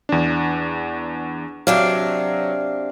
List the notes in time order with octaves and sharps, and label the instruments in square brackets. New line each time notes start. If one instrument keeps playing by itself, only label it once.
[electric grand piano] E2 D4
[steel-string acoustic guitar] C3 D4 F5 [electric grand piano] F#3